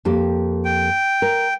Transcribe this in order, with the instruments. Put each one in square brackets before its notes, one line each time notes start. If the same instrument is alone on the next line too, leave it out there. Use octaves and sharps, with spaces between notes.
[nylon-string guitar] F2 A#3 G4
[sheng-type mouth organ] G5
[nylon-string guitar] A#4